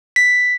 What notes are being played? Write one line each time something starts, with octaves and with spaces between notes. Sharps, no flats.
B6